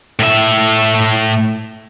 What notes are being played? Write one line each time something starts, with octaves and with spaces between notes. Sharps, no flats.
A2 E5